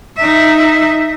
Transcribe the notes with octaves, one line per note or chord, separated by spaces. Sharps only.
D#4 E5